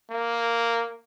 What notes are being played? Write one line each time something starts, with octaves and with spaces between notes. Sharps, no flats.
A#3